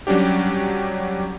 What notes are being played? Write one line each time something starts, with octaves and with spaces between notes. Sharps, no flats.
F#3 G3 C#4 D4 G4